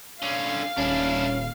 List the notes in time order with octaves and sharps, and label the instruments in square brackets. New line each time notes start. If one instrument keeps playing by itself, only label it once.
[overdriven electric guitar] D3 C#4 [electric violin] F5
[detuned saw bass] D#1 [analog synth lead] C#4 [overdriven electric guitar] D4 E4